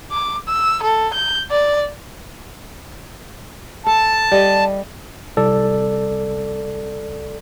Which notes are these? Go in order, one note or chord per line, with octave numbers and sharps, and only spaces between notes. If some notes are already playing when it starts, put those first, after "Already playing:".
D6
E6
A4
G6
D5
A4 A5
G3 D#5
C2 A4 D5